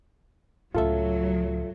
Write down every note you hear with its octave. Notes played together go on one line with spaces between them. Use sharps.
C#2 A2 F#3 F4 A4 E5